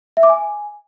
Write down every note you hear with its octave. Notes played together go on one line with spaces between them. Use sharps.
E5
D6
G#5